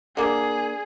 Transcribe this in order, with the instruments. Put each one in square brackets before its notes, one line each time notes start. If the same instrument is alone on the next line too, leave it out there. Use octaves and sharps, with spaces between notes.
[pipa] D3 A#3 [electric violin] G#4